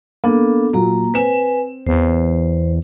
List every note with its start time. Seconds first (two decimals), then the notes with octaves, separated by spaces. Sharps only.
0.24 A#3 B3 D4 A4
0.73 A#2 F#3 A#3 A#5
1.14 C4 B4 G#5 E7
1.87 E2 C5